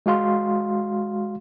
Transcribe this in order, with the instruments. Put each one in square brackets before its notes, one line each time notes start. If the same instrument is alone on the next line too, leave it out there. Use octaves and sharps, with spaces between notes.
[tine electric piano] G#3 F#4 F5 C6